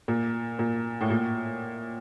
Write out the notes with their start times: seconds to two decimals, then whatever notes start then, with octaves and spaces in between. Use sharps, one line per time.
0.08 A#2
0.59 A#2
1.01 A2
1.10 A#2